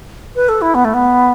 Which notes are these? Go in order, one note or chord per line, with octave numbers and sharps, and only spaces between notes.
B4
A4
E4
B3
A3
B3